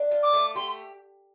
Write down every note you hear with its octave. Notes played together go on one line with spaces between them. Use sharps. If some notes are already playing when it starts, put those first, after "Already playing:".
Already playing: D4
F4
D6
A3
G4 C6